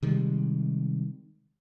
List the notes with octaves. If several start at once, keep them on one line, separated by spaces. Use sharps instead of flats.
C3 D#3 G3 G#3